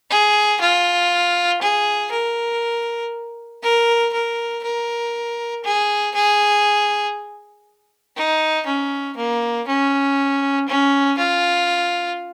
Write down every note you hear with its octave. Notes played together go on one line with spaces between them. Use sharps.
G#4
F4
G#4
A#4
A#4
A#4
A#4
G#4
G#4
D#4
C#4
A#3
C#4
C#4
F4